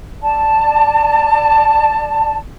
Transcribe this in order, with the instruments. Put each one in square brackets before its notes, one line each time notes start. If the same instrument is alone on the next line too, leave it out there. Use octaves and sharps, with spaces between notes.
[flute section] D5 A5